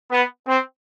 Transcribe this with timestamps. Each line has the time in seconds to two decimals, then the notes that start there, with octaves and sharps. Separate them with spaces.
0.11 B3
0.47 C4